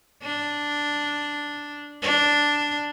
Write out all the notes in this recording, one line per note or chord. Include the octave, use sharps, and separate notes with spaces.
D4
D4